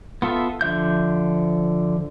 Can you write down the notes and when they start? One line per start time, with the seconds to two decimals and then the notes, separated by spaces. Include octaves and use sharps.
0.22 B3 F4 A4 E5
0.61 D3 F3 E5 G6